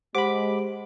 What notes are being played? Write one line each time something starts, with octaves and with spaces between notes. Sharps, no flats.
G#3 G4 C5 F#5 B5 D6